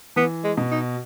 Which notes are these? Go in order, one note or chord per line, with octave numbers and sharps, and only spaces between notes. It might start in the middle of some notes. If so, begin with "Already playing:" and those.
E3 B3
G#3
B2
D#4